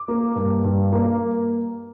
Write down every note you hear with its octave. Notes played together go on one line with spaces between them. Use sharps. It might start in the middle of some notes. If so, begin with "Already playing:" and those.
Already playing: D6
A#3
G2
G2
A#3